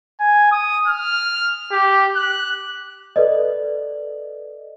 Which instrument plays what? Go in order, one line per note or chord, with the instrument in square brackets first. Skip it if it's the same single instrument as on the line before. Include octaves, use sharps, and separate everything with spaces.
[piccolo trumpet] G#5
D#6
F6
G4
F#6
[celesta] A4 B4 D5 D#5